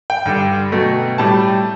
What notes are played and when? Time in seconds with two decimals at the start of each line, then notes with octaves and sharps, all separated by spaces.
0.10 G5
0.25 G2 D3 G3
0.72 B2 F#3 A3
1.18 A2 G3 A5